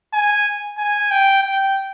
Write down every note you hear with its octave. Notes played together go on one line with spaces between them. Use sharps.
G#5
G#5
G5
G5